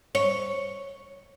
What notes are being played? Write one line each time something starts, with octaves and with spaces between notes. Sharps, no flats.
C#5